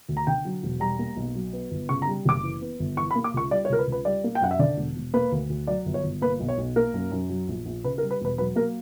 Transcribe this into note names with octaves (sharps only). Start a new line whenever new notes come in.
D2
A#5
D3 G5
F#3
E1
G3 A#5
A#3
B1
F#3
B3
G1
C#3 C#6
A#5
G3
F#1 D6
E3
B3
G1
E3 C#6
B5
A#3
D6
C#2 C#6
G3 D5
C#5
C#2 A#4
B4
C#2
B4
G3 D5
A#3
G5
F#2 F#5
E5
D3 D5
E1
E1
A#3 B4
D2
D2
F#3 D5
G1
C#5
G1
A#3 B4
B1
C#5
B1
A#3 A#4
F#2
F#2
F#3
A#1
A#1
C#3 B4
A#4
G3
B4
E1 B4
F#3 B4
A#3 A#4